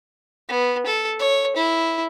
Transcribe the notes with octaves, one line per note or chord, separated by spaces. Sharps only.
B3
A4
C#5
E4